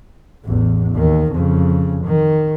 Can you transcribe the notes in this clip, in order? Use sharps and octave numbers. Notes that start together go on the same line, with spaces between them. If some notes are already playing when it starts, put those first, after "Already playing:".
A1 E2
D#2 D#3
F2 C#3
D#3